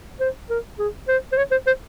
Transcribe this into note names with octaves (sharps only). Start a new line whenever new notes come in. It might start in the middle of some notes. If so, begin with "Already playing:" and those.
C5
A#4
G#4
C5
C5
C#5
C5
C5